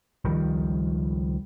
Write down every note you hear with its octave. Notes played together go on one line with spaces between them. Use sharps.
C#2 D#3 F3 G3